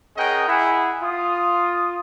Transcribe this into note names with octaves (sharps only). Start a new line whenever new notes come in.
C#4 G#4 A#4 D#5 F#5 G5
E4 G#4 F#5
F4 D#6